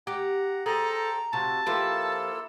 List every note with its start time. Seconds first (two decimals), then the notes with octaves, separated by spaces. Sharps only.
0.07 G4 F#5 A#5
0.66 G#4 A4 C5 G5 A5 A#5
1.33 C3 F4 F#4 C5 A5
1.66 F3 A#3 E4 F4 G4 A4 B4